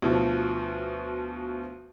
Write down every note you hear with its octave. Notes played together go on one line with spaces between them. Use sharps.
D2 B2 F3